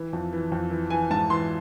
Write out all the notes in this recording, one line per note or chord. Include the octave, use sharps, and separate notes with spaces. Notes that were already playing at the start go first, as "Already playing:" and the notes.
Already playing: E3
F2
E3
F2
E3
E3 G#5
G#2 A5
E3 C6